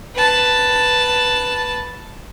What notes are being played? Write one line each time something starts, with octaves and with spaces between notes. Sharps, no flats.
B4 A5